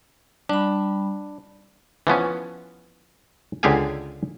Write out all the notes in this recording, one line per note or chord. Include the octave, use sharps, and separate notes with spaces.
G3 D4 B5
E3 F3 B3 C#4
C#2 D3 G4 G#4 F5 G#5